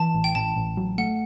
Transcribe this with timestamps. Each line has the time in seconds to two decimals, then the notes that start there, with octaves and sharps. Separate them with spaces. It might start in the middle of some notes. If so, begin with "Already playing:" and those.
Already playing: E3 A5
0.14 A1
0.24 G5
0.35 A1 A5
0.56 A1
0.77 F#3
0.98 A3 F#5